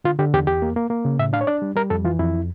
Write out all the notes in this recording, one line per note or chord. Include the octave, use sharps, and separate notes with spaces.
D3 F4
D3 G4
E2 G4
E2 G4
A#3
A#3
A#3
C#3
A2 E5
D4 F5
C#5
D4 D5
G3
G3 A#4
F2 A4
E3 F4
F2 E4